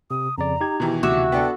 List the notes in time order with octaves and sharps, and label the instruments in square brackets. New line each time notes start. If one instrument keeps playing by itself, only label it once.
[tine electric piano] C3 [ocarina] D#6
[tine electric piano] F2 C#3 D5 [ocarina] A#5
[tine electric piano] D#4 G4 G#6
[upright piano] B2 D#3 E3
[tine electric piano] D2 C3 [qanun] F#4 E5 [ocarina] D6
[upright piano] B3 D4 A4 [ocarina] G5